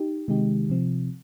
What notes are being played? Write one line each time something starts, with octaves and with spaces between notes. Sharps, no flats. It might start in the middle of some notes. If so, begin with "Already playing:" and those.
Already playing: D#4 G4
C3 D#3 G#3 D#4 G4
C3 F3 C4